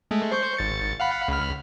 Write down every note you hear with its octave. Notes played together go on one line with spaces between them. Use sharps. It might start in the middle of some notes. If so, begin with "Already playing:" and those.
G#3 A3
C5 C#6 G6
G#1 A6 C#7
F5 F#5 B5
C#2 B5 F6